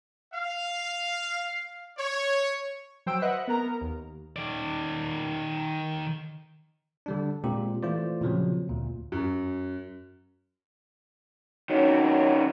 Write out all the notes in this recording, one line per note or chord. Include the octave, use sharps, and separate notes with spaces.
F5
C#5
F#3 C5 G5 E6 D7
B4 D#5 E5 F#5 F#6
B3 A#4 A#5
D#2
D#3 D5
D3 G3 D4
A#2 G#3 C4 G4
E3 A3 F4 C5 D5
A#2 C#3 F3 F#3 C4
D2 A#2
F#2
D#3 F#3 C#4